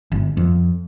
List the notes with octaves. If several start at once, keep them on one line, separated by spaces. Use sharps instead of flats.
G1
F2